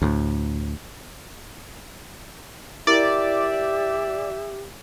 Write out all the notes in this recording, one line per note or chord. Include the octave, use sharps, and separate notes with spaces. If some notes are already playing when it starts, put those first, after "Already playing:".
D2 A2
E4 G4 A#4 D5 E5